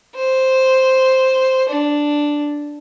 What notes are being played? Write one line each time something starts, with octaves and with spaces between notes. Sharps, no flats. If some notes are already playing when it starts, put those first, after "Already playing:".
C5
D4